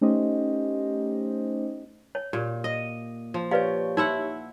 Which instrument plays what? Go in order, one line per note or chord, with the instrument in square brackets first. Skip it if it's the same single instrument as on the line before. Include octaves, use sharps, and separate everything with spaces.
[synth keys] A3 C#4 D#4 G4 C5 D#5
[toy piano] C#5
[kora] A#2 [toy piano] G4
[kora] D#5
F3
[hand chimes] G4 C#5 [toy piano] B4 D5 F5
[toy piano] D#4 C6 E6 [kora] E4 E5 F#5